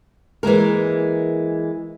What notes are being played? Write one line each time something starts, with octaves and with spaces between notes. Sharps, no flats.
E3 G#3 A#3 A#4